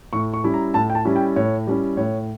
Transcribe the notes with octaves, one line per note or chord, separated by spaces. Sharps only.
A2 C#6
C#6
G3 C#4 E4
A#5
A2 A5
G5
A5
G3 C#4 E4
G5
A2 C#5
G3 C#4 E4
A2 C#5